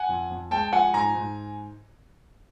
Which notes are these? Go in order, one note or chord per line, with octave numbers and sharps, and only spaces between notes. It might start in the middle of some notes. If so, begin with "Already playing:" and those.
Already playing: F#5 G#5
F2
F2
G#3 G5 A5
F3 F#5 G#5
G#2 G#5 A#5
G#2